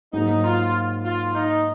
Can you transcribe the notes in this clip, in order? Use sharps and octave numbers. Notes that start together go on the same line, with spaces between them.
G#2 F#3 A#3 D#4
F4
F4
D#4